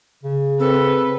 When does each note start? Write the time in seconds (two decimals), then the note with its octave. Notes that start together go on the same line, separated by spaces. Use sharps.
0.23 C#3
0.60 C4 A4 B4